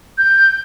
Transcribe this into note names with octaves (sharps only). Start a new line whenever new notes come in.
G6